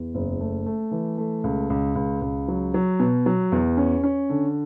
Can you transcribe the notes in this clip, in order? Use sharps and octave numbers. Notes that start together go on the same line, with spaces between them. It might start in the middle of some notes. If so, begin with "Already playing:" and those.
Already playing: E2
F#1
A3
A3
E3
A3
C#2
C#2
C#2
C#2
F#3
F#3
B2
F#3
E2
C#4
C#4
D3